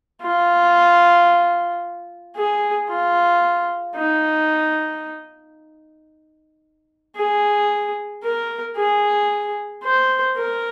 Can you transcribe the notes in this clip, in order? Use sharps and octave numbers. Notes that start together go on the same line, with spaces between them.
F4
G#4
F4
D#4
G#4
A#4
G#4
C5
A#4